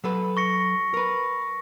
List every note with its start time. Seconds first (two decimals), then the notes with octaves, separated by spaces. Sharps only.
0.04 F#3 A4 B4
0.37 C#6 A#6 C#7
0.94 A#4 B4